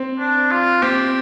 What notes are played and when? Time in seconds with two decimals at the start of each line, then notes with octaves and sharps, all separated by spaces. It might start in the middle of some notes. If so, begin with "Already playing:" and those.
Already playing: C4
0.19 D4
0.51 F4
0.82 C4 G4